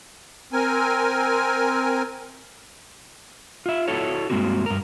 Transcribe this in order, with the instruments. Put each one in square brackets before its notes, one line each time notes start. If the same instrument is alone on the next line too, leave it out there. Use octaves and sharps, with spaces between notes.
[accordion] C4 A#4 G#5
[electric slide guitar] F4 E5
E4 F#4 A4 C#5
G2 D3 G#3 A#3 C4 F#4
G2 A#4